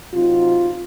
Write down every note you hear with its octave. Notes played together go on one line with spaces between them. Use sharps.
C3 F#3 C4 D#4 F4